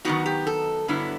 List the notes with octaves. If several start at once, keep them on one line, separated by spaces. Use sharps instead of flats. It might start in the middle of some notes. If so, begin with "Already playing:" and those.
D#3 F#3 B3 D#4 F#4
G4
A4
G2 D3 F#3 B3 E4